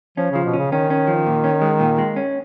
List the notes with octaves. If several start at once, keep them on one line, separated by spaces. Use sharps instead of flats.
F3 C#4
C#3 F3
B2
C#3 C#4
D#3 C#4
C#4
F3
A#2
C#4
G#3
A#2
G#3
C#4